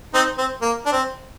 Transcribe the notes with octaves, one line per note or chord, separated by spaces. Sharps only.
C4 D#4
C4
A#3
D4
C4